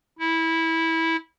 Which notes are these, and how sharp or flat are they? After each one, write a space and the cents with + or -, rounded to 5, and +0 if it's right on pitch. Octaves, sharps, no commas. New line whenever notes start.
E4 -15